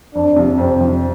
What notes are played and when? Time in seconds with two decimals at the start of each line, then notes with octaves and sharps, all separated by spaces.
0.15 F2 D4
0.36 C3 F3
0.58 F2 C4
0.80 C3 F3